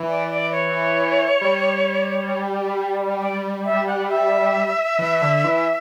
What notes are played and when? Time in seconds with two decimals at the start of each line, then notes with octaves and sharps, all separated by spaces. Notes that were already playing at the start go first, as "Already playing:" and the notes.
Already playing: E3
0.08 D5
0.31 D5
0.52 C#5
1.41 G3
3.20 D5
3.65 E5
3.87 F#5
4.09 E5
4.99 E3
5.22 D3
5.44 E3